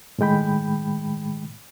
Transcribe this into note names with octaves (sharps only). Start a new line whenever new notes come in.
A2 D#3 G#3 G5 B5